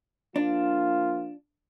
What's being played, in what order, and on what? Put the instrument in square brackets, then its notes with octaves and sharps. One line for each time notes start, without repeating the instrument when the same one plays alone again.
[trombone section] F3 A#3 F4 [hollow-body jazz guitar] D4